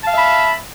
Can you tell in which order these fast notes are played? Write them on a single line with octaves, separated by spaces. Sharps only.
A5 F5 E5 B5